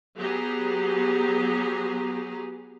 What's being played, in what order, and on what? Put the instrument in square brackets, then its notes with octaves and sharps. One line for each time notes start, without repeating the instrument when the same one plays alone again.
[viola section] F#3 B3 G4 G#4 A#5